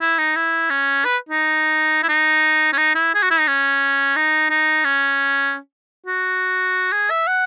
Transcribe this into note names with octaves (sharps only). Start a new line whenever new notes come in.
E4
D#4
E4
C#4
B4
D#4
E4
D#4
C#4
D#4
E4
G#4
F#4
E4
D#4
C#4
D#4
D#4
C#4
F#4
G#4
E5
F#5